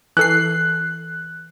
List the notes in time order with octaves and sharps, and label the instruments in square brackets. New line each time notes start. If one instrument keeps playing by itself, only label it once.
[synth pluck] E3 A4 C7 [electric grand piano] F#6